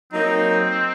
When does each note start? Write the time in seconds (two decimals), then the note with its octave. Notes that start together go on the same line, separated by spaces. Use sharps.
0.12 F#3 A#3 C4 D#4